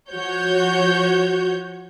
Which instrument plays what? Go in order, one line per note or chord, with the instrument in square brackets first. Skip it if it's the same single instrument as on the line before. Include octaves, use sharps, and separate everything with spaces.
[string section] F3 F#4 C#5 G6